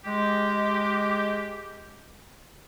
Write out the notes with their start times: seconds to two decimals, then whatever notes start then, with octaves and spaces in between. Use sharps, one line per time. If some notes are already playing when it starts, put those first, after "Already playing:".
0.05 G#3 G4